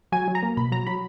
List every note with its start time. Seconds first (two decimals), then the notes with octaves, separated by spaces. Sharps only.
0.12 F#3 G#5
0.28 F#3
0.35 A#5
0.43 A#3
0.57 B2 B5
0.72 F#3 A#5
0.87 F#3 B5